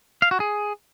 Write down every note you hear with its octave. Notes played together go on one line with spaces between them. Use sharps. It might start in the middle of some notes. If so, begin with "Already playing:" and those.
F5
F#4
G#4